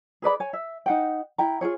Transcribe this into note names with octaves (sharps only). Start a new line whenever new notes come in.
G#4 B4 D5 B5
C#5 G#5
E5
D#4 F#5 G5
E4 G5 A#5
F4 F#4 G#4 C#5